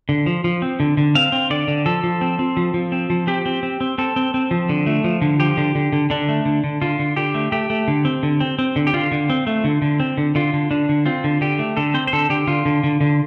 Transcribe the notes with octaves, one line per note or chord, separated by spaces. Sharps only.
D3
F3
F3
C4
D3
D3
C4 F5
C4
D3 D5
D3
F3 A4
F3
C4
C4
F3
F3
C4
F3
C4 G4
C4
C4
C4
C4 A4
C4
C4
F3
D3
A3
F3
D3
F3 G4
D3
D3
D3
D3 D4
A3
D3
D3
D3 F4
D3
D3 G4
A3
A3 G4
A3
D3
C4
D3
C4
C4
D3
G4
D3 F4
D3
C4
A3
D3
D3
C4
D3
D3 F4
D3
D3 D4
D3
C4 F4
D3
D3 G4
A3
D3 A4
C4 C5
C5
D3 A4
D3 G4
D3 F4
D3
D3
D3